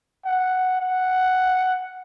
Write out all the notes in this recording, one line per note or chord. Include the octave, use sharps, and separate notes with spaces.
F#5
F#5